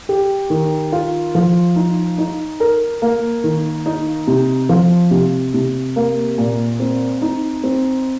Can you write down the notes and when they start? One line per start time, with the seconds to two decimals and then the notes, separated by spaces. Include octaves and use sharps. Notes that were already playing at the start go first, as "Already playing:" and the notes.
0.09 G4
0.50 D#3
0.92 F4
1.35 F3
1.76 D#4
2.18 D#4
2.60 A#4
3.02 A#3
3.44 D#3
3.86 D#4
4.28 C3
4.69 F3
5.11 C3
5.54 C3
5.96 A#3
6.38 A#2
6.80 C4
7.22 D#4
7.64 C4